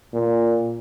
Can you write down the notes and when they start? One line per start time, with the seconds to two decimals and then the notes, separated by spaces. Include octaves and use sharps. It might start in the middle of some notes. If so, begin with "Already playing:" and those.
0.14 A#2